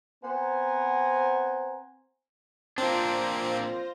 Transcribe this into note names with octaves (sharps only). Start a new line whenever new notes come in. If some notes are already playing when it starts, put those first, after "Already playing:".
B3 C4 C5 F#5 G#5 A#5
A#3 C4 D4 F4 C5 A#6